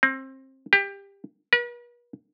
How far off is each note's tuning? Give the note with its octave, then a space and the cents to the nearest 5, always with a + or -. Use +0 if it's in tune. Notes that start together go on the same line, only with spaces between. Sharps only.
C4 +25
G4 +20
B4 -45